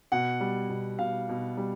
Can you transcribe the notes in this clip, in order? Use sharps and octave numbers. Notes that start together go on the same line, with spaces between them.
B2 F#5
G3
B2
B2 F5
B2
G3